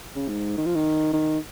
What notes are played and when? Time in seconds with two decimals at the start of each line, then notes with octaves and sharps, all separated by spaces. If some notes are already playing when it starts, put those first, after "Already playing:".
0.15 C#3
0.29 G#2
0.57 D#3
0.66 F3
0.75 D#3
1.13 D#3